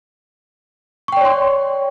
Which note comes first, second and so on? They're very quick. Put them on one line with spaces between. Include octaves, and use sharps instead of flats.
C#6 G5 D5 C#5 C6